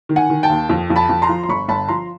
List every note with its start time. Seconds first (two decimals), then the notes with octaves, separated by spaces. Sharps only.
0.09 D#3
0.16 F#5 G#5
0.30 D#3
0.43 G5 A5
0.50 D#2
0.69 F2
0.90 F2
0.96 A5 B5
1.09 F2
1.22 A#5 C6
1.29 F3
1.43 C6
1.49 G1 B5 C#6
1.68 G1 A5 B5
1.88 F3 A#5 C6